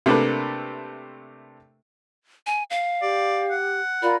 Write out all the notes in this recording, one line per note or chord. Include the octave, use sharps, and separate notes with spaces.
C3 A3 A#3 D4 A4 B4
G#5
F5
G4 D5
F#5
F4 A#4 D5 B5